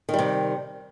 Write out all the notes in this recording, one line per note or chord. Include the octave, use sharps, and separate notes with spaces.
C3 D#3 G3